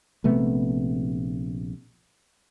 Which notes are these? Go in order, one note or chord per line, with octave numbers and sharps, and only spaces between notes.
A#1 C3 A3 B3